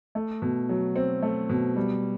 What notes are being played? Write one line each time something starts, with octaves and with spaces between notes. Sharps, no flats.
A3
B2
F#3
C4
A3
B2
G3